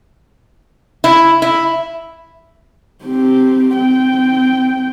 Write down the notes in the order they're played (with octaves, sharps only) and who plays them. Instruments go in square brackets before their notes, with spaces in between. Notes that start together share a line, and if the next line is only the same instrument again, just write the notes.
[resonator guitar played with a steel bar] E4
E4
[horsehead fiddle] C4 G4
C4 G5